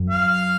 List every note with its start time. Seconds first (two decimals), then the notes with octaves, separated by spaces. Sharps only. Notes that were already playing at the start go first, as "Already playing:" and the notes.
Already playing: F#2
0.10 F5